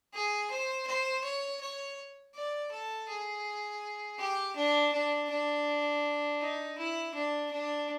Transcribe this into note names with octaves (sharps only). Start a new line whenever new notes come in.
G#4
C5
C5
C#5
C#5
D5
A4
G#4
G4
D4
D4
D4
D#4
E4
D4
D4